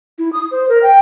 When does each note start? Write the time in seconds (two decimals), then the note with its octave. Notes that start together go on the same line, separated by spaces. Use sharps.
0.18 E4
0.33 D#6
0.51 C5
0.69 A#4
0.83 G5